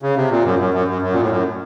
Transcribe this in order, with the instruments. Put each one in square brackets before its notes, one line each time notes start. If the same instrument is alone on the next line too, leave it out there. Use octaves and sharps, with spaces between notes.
[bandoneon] C#3
C3
A#2
F#2
F#2
F#2
F#2
F#2
A#2
A2
F#2